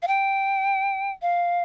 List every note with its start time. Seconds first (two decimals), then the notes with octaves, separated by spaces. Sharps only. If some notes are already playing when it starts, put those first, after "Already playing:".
0.02 F5
0.08 G5
1.22 F5